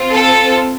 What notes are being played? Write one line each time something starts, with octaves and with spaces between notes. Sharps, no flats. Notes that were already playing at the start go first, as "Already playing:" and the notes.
Already playing: C4 F4
A4